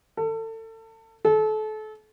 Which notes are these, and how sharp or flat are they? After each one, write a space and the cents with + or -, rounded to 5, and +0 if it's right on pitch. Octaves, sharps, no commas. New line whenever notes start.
A4 +30
A4 -30